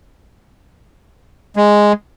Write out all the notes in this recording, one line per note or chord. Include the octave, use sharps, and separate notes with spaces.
G#3